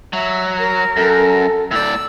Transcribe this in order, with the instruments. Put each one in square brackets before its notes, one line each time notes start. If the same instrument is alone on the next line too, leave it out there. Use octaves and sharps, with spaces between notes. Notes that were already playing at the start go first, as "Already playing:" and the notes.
[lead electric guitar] F#3 [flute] E5
[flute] A#4
[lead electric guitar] F#2 [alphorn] A4
[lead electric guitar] A2 D5 [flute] E6